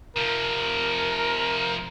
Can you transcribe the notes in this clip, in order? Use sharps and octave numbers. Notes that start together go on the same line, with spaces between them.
C3 F3 A#4